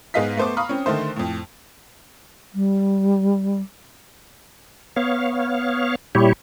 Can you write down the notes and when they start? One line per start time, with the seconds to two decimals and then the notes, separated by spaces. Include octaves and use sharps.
0.14 G#2 B3 G#4 D#5 F5 B6
0.37 A3 B3 C5 C#6 D6
0.57 F5 A#5 B5 C#6 D#6 F6
0.69 C4 C#4
0.86 D3 D#3 A3 C5
1.16 F2 A2
2.54 G3
4.96 B3 C#5 F5
6.15 A#2 G3 E4 G4 C#5